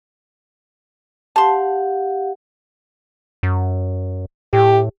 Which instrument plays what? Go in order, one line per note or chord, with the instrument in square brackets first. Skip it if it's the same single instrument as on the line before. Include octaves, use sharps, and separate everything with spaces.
[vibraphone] G4 F5 F#5 [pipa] A5 C6
[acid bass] F#2
[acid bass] A2 [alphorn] G4